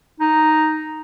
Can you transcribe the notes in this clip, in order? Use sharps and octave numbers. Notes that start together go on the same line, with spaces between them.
D#4